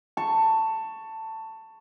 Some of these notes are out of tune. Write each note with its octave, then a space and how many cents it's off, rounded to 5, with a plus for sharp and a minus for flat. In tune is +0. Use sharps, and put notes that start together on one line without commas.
A5 +15 C#6 +0